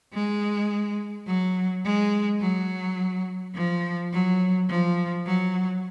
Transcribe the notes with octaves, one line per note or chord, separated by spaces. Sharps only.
G#3
F#3
G#3
F#3
F3
F#3
F3
F#3